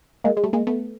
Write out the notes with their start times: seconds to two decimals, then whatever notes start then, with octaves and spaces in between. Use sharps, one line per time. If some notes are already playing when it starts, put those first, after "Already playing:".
0.24 G#3 A#3
0.37 G#3
0.44 G3 A3
0.53 G#3 A#3
0.67 A3 B3